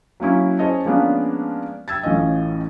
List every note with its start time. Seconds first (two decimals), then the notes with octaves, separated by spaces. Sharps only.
0.20 F#3 A#3 C#4 E4
0.59 C#4 G#4 C5 C#5 D#5 A5
0.85 F3 G#3 A#3 B3 C#4 D4
1.88 G5 E6 G#6 A6
2.03 A1 A2 C#4 F4 D#5